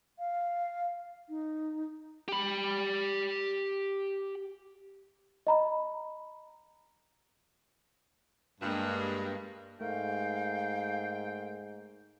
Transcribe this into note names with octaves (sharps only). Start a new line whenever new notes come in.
F5
D#4
G4 B5
D#5 A#5 B5
G2 G#3 A#3
G#2 A3 A#4 F5 G5